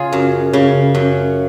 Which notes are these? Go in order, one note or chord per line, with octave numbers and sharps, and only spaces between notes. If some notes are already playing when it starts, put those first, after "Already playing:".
Already playing: C#3 F4 G#4
F#2
C#3
F#2